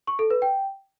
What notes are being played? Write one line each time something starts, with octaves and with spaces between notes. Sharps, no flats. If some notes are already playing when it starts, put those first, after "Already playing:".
C#6
A4
B4
G5